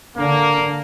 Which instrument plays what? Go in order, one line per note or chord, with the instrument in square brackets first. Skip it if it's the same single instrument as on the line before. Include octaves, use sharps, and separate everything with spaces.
[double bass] D3 D4 [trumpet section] A#3